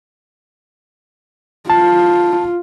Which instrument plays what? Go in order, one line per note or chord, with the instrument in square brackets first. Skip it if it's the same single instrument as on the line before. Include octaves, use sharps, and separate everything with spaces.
[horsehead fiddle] F4 [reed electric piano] A5